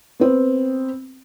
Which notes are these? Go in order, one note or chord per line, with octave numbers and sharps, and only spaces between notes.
B3 C4